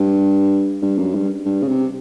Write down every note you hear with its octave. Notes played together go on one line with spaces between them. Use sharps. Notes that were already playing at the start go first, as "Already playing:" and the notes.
Already playing: G2
G2
F#2
G2
G2
C#3
C3